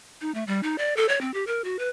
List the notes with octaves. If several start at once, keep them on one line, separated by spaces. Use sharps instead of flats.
D#4
A3
G3
D#4
D5
A4
C#5
C4
G4
A#4
F#4
B4